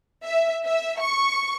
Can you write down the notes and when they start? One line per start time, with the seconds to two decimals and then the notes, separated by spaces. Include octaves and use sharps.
0.24 E5
0.65 E5
1.01 C#6